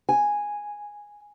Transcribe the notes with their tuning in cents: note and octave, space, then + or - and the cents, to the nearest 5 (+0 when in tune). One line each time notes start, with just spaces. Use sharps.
G#5 -5